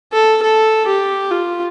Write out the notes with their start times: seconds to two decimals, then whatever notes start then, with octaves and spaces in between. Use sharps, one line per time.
0.13 A4
0.43 A4
0.87 G4
1.31 F4